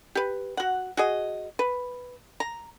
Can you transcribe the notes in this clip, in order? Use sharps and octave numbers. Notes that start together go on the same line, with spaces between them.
G4 B4
F#4 F#5
F#4 G#4 D#5
B4
A#5